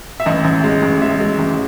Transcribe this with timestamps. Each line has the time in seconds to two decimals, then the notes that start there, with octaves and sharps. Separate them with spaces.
0.20 E5
0.26 A1 D#5
0.45 A1
0.64 G#3
0.82 A1
1.01 G#3 E5
1.20 G#3
1.39 A1